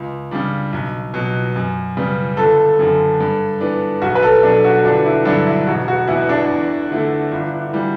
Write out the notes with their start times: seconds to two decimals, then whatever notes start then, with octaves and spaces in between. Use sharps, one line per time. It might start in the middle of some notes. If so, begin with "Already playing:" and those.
Already playing: C#2
0.31 C#3 G3 D4
0.73 B1
1.14 B2 F#3
1.56 F#2
1.97 C#3 G3 B3
2.37 G1 A4
2.79 F#2 D3
3.20 G2
3.61 E3 B3 D4
4.02 B1 F#4
4.15 B4
4.23 A4
4.43 B2 F#3 D4
4.64 F#4
4.84 G1 D4
5.06 E4
5.25 G2 D3 F#3 D4
5.47 E4
5.67 E1 F#4
5.88 F#4
6.07 E2 B2 E4
6.29 D4
6.49 E2
6.91 D3 A3 E4
7.32 G1
7.73 E3 G3